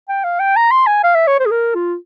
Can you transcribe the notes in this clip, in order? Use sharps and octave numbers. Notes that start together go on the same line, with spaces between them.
G5
F5
G5
A#5
C6
G#5
F5
E5
C#5
C5
G#4
A#4
F4